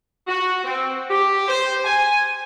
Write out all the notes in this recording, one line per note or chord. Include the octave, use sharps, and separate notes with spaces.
F#4
C4
G4
C5
G#5